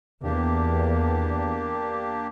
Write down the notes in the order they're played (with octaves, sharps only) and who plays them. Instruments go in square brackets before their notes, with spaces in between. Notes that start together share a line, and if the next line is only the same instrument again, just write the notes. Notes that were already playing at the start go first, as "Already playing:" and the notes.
[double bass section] E2 [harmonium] A#3 D4 G4